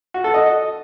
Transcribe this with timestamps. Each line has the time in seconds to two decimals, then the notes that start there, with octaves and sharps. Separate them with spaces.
0.14 F#4
0.24 A4
0.34 D#5